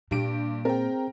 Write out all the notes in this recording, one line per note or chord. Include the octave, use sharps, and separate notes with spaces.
G2 A#2 G4 D7
C4 G#4 A#4 C5 G5